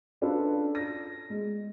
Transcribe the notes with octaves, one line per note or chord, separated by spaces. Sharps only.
C#4 D4 F4 A4 B4
A#6
G#3